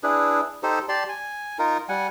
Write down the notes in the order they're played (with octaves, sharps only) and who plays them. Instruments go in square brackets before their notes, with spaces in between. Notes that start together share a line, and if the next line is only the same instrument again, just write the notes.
[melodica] D4 E4 G#4 B4
D#4 G4 A4 C5
G4 D5 A5 C6
G#5
D#4 F4 A#4
G3 F#5 G#5